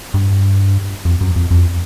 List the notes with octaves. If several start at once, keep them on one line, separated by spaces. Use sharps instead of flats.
G2
F2
F#2
F2
F2